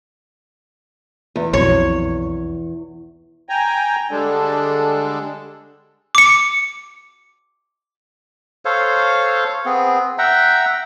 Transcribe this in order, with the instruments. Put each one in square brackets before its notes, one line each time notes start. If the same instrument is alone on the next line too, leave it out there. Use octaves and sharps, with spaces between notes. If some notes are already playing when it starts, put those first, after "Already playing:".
[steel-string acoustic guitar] E2
[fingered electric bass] B1 F2 B2 [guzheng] C#5
[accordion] G5 G#5 A#5
D3 G3 G#3 D4 A4
[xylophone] D6 C#7
[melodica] A4 C5 C#5 F5
B3 C4 G#4
E5 F#5 G5 A#5